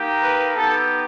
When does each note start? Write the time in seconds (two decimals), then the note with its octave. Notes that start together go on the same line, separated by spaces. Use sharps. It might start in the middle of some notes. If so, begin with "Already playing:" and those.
Already playing: A#3 D#4 G4
0.23 B4
0.55 B3 D#4 G4 A4